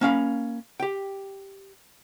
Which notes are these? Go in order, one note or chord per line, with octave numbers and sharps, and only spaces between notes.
A#3 C#4 F5 B5
G4 G5